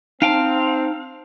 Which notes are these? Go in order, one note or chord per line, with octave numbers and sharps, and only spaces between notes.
C4 D#4 F5 G5 A5